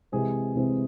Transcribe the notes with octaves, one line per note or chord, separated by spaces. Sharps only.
C3 E3 G#3 C4 G#4
C3 E3 G#3 C4